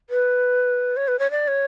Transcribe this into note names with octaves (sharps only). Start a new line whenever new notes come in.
B4
C#5
B4
C#5
D5
C#5